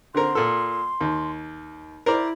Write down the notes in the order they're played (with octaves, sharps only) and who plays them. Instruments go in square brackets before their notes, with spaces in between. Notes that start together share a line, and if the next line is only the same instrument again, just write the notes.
[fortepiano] D3 C4 A#4 [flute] C6
[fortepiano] A#2 A4
D#2
[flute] E4 [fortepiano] A#4 C5 D5